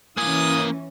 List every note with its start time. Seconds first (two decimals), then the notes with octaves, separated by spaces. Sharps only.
0.17 E3 A#3 C#4 F5 G#5 D#6